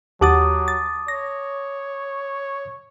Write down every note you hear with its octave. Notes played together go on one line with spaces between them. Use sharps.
D#2 F#3 G4 F#5 A5 D6 D#6 A6
A6
C#5 A#6